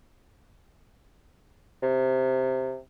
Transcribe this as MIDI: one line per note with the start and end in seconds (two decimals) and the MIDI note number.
1.83 2.78 48